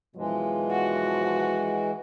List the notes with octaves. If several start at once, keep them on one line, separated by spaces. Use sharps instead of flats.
F#2 B2 E3 F3 G#3
F#4